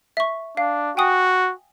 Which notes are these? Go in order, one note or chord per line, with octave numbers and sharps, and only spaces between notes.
E5 C#6
D4 F5
F#4 G5 G#5 D#6